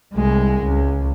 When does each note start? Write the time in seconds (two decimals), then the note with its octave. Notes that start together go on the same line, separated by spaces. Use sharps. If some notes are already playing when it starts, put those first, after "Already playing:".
0.15 C2 G#3
0.63 C#2